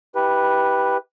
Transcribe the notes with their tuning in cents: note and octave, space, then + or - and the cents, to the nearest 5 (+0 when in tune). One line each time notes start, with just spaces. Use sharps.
E4 -35 G4 +0 B4 -5